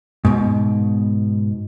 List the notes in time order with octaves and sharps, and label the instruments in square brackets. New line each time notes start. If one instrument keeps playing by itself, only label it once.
[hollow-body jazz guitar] G#2 B2